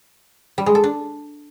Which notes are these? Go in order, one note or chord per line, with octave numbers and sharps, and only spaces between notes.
G3
G#3
A4
D4